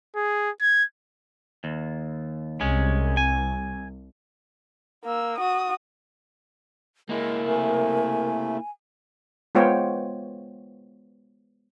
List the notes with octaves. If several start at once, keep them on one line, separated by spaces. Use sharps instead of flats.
G#4
G#6
D#2
C2 G#3 C#4
G#5
A#3 E6
F#4 D#6
G#3 A#3 E4 A#4
C3 A3 G#5
G#3 B3 F4 C5 C#5 G5